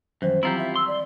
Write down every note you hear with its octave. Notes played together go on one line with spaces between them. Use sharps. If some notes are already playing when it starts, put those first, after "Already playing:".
F#2 D#3 E3 G3 C5
F#3 C4 E4 F4 G4 A#5
E5
C6 E6
D5